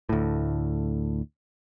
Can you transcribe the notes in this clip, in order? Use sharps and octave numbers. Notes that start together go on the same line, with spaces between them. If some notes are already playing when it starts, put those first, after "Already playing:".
D2 A2